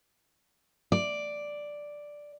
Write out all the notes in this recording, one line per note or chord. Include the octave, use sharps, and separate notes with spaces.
D5